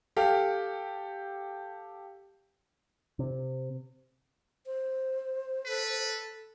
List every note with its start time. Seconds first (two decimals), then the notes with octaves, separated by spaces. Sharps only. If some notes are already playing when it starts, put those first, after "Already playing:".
0.17 G4 A4 F5
3.19 C3
4.66 C5
5.66 A4 B4